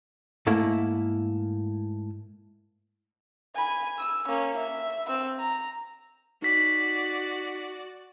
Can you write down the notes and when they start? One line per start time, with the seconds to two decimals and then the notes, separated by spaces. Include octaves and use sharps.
0.47 G#2 A3 A#3 E4
3.55 G#5 B5
3.99 E6
4.28 A#3 C#4
4.58 E5
5.09 C4 E6
5.39 A#5
6.42 D#4 F#4 D5 B6